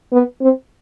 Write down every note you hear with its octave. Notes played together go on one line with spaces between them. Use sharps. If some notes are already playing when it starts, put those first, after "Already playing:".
B3
C4